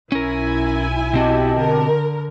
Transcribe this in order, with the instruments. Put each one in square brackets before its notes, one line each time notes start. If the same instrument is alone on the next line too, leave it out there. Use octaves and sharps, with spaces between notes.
[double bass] B1 [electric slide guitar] C#4 A#4 [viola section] E4 G#5
[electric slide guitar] B2 C4 F#4 [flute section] G4 D#5 A5
[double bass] D3 [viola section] A#4